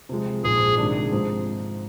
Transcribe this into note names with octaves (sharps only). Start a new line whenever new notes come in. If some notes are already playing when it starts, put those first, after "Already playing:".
C3 F3 G#3
A#1 G#2 F3 G#3 G#4
C3 D#3 G#3 D4
G#2 F3 C4